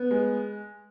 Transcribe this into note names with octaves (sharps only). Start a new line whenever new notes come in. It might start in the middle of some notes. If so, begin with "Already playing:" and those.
Already playing: B3
G#3